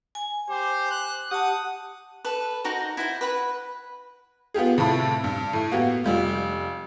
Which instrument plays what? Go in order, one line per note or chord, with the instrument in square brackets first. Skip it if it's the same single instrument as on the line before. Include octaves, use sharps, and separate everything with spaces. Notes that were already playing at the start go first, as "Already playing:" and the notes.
[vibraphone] G#5
[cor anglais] G4 [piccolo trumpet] C5
[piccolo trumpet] F#6
[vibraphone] G4 A5 [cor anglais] F#5 [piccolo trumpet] D#6
[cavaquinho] A4 B4
D#4 F#4 A#4 C5
E4 F#4 C5
B4 F#5 B5
[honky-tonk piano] B3 F4 G4 G#4
A2 C3 F4 A4 B5
G2
A2
A#3 B3 F#4 G4
F1 G3 F4